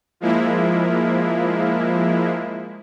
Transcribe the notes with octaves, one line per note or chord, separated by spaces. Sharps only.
F3 G#3 A#3 E4